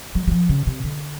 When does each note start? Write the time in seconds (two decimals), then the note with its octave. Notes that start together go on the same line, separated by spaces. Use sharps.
0.15 F#3
0.28 F#3
0.32 F3
0.49 C#3
0.67 C3
0.84 D3